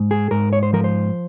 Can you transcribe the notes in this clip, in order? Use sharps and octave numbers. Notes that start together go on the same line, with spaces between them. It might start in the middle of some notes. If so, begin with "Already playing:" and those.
Already playing: G#2
G#4
G#2 A#4
C#5
C5
F3 A#4
C5